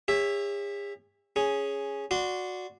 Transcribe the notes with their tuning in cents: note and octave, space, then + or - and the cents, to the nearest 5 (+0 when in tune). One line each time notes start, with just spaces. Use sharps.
G#4 -45 C#5 +0 E5 +0
C#4 +0 G#4 +0
F#4 -15 D5 +0 C6 -25